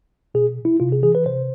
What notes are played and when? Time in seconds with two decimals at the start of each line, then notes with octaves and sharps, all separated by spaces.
0.34 B2 G#4
0.65 E4
0.80 C3 F4
0.92 G#4
1.03 E3 G#4
1.15 B4
1.26 C3 C5